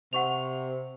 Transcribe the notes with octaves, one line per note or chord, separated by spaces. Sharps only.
C3 F#5 C#6 F7